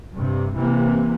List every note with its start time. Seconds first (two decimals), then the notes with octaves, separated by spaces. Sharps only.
0.15 G2 C3
0.57 C3 E3 A#3